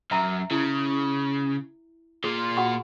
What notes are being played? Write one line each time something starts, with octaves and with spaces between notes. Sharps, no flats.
F#2 E5 A#5
C#3 E4
A#2 F4 G#4
F#4 F#5 C#6